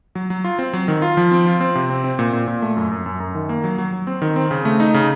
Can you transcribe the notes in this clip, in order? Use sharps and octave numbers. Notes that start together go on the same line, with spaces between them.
F#3
F#3
F4
C4
F#3
D#3
F4
F3
C4
F4
C4
C3
C4
C4
A#2
A#2
A#2
A3
F#2
F#2
F#2
F#2
D#3
A#3
F#3
F#3
F#3
C4
D#3
C4
C#3
A3
D#4
C#3